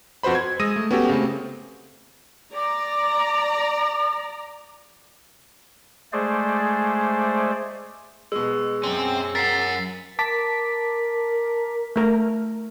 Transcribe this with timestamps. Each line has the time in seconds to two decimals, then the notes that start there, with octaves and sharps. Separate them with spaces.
0.23 F2 F#4 B4 C5 B5
0.35 G#6
0.59 G#3 D#6 E6 A#6 D#7
0.76 A3
0.91 B3 C#4 F#4 G4 A4
1.09 C#3 A3 C4
2.54 D5 A#5 D6
6.13 G#3 A3 G#4 C5 D5
8.32 B2 G#3 E6
8.83 F#2 C4 C#4
9.35 A#4 F#5 A6 B6 C7
10.19 A#4 A5 D6 B6
11.96 A3 A#4 A#5